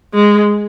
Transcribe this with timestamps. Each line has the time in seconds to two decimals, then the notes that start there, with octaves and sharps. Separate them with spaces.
0.14 G#3